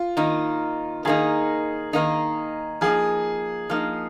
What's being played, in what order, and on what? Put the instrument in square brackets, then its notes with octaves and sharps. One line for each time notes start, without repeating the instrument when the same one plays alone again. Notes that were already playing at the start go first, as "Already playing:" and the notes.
Already playing: [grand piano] F4
[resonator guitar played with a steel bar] D#3 A#3 D#4
[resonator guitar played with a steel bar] D#3 A#3 D#4 [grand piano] G#4
[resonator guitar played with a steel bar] D#3 A#3 D#4
[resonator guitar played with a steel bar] F3 A#3 D#4 [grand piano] G#4
[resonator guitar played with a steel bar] F3 A#3 D#4